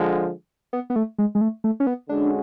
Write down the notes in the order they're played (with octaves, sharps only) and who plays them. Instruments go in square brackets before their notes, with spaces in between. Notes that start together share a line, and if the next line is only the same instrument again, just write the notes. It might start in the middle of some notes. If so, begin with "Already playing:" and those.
Already playing: [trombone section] D3 F3 G#3
[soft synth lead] B3
B3
A3
G#3
G#3
A3
A3
C#4
B3
[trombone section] D3 G#3 C#4 F#4 [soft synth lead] D4